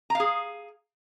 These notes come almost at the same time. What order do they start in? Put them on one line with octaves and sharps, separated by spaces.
A#5 F5 G#4